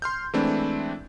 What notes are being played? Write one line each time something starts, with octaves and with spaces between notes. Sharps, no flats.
C6 F6 G6
E3 G#3 A3 C4 D4 E4